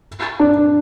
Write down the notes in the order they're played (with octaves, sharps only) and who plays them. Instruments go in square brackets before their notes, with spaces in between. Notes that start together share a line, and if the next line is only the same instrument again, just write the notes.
[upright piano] D4